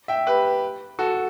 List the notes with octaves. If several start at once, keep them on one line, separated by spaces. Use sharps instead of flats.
E5 G5
G4 B4
F#4 A4